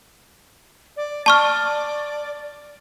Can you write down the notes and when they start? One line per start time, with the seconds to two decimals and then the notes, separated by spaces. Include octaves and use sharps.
0.97 D5
1.26 D5 A5 C#6 F6